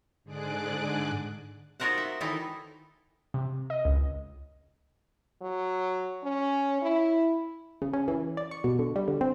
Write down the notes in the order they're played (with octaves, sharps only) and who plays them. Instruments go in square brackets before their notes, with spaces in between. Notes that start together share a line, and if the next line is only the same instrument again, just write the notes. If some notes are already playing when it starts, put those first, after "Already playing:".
[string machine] G#2 D3 G#4 D5 D6 F#6
[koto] D#4 F4 F#4 A#4 C5 F#5
E5
D#3 E3 D#4 E4 A4 D#5
[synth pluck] C3
D#5
C#2
[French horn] F#3
C#4
E4
[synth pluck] C#3
C#4
E3
D5
C#6
B2
D3
G3
D3
C4